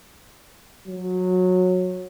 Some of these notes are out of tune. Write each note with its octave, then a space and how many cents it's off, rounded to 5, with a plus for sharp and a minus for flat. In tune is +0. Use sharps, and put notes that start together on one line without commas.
F#3 -15